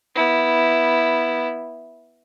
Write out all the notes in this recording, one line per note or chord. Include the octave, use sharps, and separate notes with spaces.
B3 E4